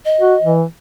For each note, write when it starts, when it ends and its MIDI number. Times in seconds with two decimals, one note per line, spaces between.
0.05 0.52 75
0.21 0.35 66
0.43 0.64 52